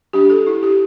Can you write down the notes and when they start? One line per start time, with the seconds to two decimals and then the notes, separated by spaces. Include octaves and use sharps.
0.13 G3 D4 G4
0.30 A4
0.47 E4
0.63 G4